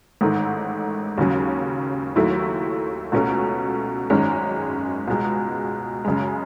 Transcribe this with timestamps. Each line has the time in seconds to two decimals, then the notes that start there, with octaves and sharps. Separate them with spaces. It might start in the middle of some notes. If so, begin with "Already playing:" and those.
0.21 A1 G#2 D#3 A3
1.18 D#2 C#3 F#3 C#4
2.16 D#2 D#3 F#3 A3 E4
3.12 C#2 B2 A3 C#4
4.10 G#1 F#2 D#3 G#3 C#4
5.08 C#2 B2 G#3
6.05 F#2 C#3 G#3